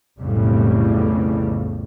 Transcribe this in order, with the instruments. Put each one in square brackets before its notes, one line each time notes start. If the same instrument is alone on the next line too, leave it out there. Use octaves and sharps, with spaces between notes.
[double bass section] B1 F2 A2 C#3 G3